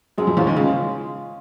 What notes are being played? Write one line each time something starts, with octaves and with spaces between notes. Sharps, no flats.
F#2 F#3 G#3
F2 F3
E2 E3 C#4 F4
D#2 D#3
C#2 C#3 G#3